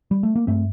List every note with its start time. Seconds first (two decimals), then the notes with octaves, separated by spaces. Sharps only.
0.11 G3
0.23 A3
0.36 A#3
0.47 G2 A3 C4